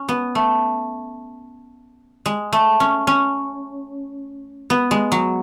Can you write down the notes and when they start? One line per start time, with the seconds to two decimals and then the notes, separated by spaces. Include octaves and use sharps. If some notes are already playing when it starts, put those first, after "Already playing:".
Already playing: C#4
0.09 B3
0.35 A3
2.26 G#3
2.52 A3
2.80 C#4
3.07 C#4
4.70 B3
4.91 G#3
5.12 F#3